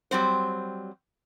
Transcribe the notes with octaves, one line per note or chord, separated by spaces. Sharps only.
F#3 G3 C4 C5